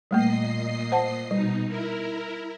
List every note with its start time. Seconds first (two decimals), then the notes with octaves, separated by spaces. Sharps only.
0.11 A#2 G3 A3 A#3 D#5 C7
0.92 C5 F#5 A5
1.31 B2 G3 D#4
1.67 E4 A#4